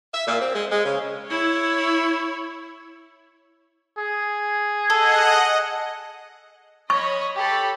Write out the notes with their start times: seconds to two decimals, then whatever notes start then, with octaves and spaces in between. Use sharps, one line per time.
0.13 E5
0.27 A#2
0.41 C4
0.54 G#3
0.70 G#3
0.85 C#3
1.27 E4 C#5
3.98 G#4
4.90 A4 D#5 F#5
6.90 C#5 D#5 B5 C#6
7.37 G4 A4 B5